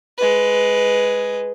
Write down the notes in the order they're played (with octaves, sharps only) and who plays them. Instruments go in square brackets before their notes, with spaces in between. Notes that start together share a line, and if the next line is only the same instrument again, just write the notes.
[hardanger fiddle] G#3 B4